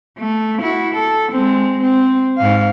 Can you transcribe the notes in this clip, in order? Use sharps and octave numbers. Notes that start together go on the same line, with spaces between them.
A3
E4 F#4
A4
G#3 C4
C4
G#2 F5